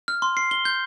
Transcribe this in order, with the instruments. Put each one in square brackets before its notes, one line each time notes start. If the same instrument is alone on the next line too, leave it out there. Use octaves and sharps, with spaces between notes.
[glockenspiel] F6
C6
C7
G7
G6